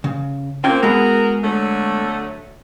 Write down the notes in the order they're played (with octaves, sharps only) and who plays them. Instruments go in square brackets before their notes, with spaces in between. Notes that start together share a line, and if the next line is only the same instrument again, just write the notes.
[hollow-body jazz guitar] C#3
[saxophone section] A#3 C4 [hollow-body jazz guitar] C#4 F4 G5
[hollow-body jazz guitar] G#3 B3 [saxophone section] F#4 G#4 A#4
[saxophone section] D3 F#3 A3